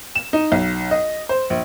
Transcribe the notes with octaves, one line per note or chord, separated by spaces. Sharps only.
E7
D#4
B1
D#5
C5
A#1